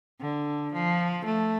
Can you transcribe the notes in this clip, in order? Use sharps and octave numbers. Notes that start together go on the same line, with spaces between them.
D3
F3
A3